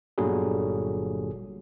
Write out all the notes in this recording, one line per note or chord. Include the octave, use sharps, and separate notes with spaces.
G1 A#2 D3 F#3 G3 G#4